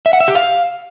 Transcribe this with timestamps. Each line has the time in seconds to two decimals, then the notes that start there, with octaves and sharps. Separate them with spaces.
0.06 E5
0.13 F#5
0.20 E5
0.28 G4
0.35 F5